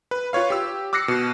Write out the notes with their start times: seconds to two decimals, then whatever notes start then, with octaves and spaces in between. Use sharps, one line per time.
0.11 B4
0.33 F4 B4 C#5 F5
0.50 G4 E6
0.93 D6 E6 F#6 A#6 C7 C#7
1.08 B2